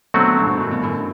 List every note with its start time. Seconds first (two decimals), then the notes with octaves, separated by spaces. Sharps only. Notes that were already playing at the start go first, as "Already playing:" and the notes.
0.14 B2 D3 F#3 A3 C4 F#4
0.37 G2 B2
0.60 F#2 A2
0.71 G2 B2
0.82 F#2 A2